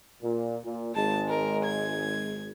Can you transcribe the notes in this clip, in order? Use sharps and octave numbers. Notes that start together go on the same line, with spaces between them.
A#2
A#2
G#1 G#3 A5
A#4
G#6